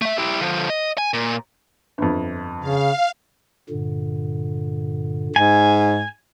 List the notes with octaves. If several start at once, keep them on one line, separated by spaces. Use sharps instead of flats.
A3 E5
E4 G4
D3 F3
D#5
G#5
A#2
G1 F2
C#3 F5
G2 A#2 D3
G#2 G#5